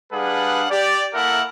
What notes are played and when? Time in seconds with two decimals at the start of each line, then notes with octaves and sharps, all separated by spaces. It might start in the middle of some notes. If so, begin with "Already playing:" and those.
0.13 G3 D4 G#4 B4 F5 F#5
0.71 G4 D5
1.14 A#3 E4 A4 A#4 E5 F#5